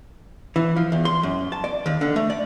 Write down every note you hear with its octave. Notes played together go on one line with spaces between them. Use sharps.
E3
F3
E2
C6
F#2
A5
D5
D#2
D3
A3
D5